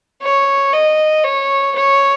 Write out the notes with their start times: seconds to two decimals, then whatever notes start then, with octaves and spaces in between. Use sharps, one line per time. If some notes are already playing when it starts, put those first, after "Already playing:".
0.22 C#5
0.74 D#5
1.24 C#5
1.75 C#5